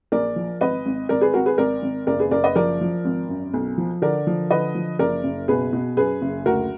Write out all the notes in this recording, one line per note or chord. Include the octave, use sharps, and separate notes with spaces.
A#1 A#4 D5
F3
G#1 B4 D#5
G#1
G#1 A#4 D5
G#4 B4
G#1 F#4 A#4
G#4 B4
G#1 A#4 D5
G#1
F#1 A#4 D5
G#4 B4
F#1 A#4 D5
B4 D#5
F3 A#4 D5
F3
G#1
F#2
B1
F3
D3 A#4 D5
F3
D3 B4 D#5
F3
F#1 A#4 D5
F#1
B2 G#4 B4
B2
F#2 G#4 B4
F#1
D2 F#4 A#4